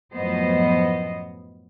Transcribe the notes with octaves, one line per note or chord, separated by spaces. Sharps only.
F#2 A2 F3 B3 C5 D#5